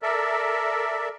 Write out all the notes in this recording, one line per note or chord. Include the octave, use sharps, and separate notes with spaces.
A4 A#4 D5 E5